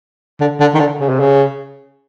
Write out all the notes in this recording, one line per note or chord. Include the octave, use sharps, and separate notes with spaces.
D3
D3
D#3
D3
C#3
C3
C#3